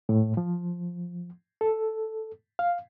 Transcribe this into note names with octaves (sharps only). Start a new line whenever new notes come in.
A2
F3
A4
F5